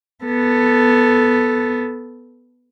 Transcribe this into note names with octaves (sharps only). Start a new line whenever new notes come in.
B3 A4